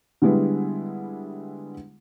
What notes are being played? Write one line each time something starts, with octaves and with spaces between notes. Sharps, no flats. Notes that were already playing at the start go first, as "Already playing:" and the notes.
D3 G3 G#3 B3 E4